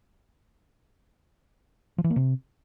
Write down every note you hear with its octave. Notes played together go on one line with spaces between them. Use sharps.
F3
E3
A#3
C3